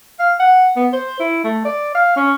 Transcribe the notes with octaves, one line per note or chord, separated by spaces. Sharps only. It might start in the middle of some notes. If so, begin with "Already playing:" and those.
F5
F#5
B3
C5
E4
A3
D5
F5
C#4